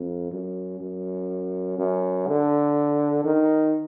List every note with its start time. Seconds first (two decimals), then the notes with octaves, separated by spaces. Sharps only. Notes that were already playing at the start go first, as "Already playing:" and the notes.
Already playing: F2
0.32 F#2
0.81 F#2
1.78 F#2
2.27 D3
3.24 D#3